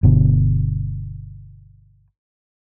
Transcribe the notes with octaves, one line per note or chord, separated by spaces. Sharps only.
G1 B2 D3